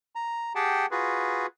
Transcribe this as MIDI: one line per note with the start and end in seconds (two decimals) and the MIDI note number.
0.15 0.53 82
0.55 0.86 67
0.55 0.86 68
0.55 0.86 78
0.55 0.86 79
0.55 0.86 81
0.91 1.46 65
0.91 1.46 66
0.91 1.46 68
0.91 1.46 71